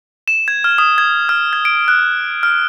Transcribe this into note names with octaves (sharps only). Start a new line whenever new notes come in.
E7
G#6
F6
D#6
G#6
F6
G#6
D7
F#6
F6